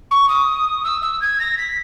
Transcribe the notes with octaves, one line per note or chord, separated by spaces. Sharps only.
C#6
D#6
E6
E6
G#6
A#6
B6